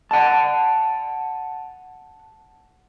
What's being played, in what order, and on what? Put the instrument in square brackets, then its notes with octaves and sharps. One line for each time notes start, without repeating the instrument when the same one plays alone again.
[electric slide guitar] F#5 A5